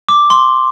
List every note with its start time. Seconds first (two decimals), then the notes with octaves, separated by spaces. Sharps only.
0.09 D6
0.30 C6